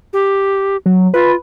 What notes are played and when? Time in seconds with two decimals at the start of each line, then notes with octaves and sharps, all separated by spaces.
0.13 G4
0.86 F#3
1.14 F4 B4